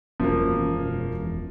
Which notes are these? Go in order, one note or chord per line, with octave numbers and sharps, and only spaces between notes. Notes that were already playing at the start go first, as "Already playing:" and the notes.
E1 F#2 F3 A#3